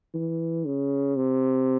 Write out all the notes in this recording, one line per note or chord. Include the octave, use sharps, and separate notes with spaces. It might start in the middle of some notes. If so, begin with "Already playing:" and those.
E3
C#3
C3